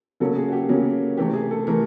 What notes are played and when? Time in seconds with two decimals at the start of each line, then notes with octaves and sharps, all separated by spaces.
0.20 C#3 F#3 A#3 C#4 A4
0.36 G#4
0.49 F#4
0.52 G4
0.68 C#3 F#3 A#3 C#4 F#4
1.17 C3 E3 A3 G4
1.33 G#4
1.51 A4
1.67 C3 E3 A3 A#4